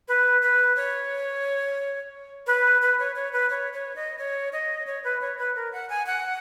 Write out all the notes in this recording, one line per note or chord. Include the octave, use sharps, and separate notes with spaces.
B4
B4
C#5
B4
B4
C#5
C#5
B4
C#5
C#5
D#5
C#5
D#5
C#5
B4
C#5
B4
A#4
F#5
G#5
F#5